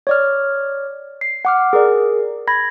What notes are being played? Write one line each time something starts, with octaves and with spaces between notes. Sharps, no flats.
C#5 D5 F6
C7
F#5 D6 F6
G#4 A#4 D5
B5 G#6 A#6